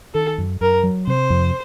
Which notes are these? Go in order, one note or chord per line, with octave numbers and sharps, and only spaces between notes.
D#3 A4
F#2
F#2 A#4
F#3
C3 C5
F2